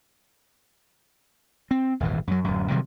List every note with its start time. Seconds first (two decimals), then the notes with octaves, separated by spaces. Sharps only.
1.71 C4
2.00 D#1 G#1 E2 E3
2.27 F#2 F#3
2.44 D1 F#2
2.70 C3 D#3 F#3 G3